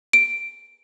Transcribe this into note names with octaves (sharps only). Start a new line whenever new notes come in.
D7